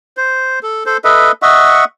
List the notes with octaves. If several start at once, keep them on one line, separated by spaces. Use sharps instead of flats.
C5
A4
A4 C5
A4 B4 D#5 E5
D#5 E5 F#5 C#6